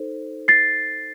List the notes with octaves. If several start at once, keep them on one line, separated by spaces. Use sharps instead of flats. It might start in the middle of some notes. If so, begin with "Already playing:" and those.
Already playing: D#4 A4 C5
A6 C7